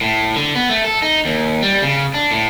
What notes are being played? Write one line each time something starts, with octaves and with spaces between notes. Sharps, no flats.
A2
D3
B3
A3
A4
D#4
D#2
G3
C#3
D4
A2